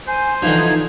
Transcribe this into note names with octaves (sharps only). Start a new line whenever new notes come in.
C5 G#5
D3 E3 F3 D#4 G#6